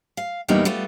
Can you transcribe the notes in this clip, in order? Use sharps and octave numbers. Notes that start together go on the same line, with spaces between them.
F5
E2 A#2 G3 A#3 B3 D#4
G3 A3 B3 F4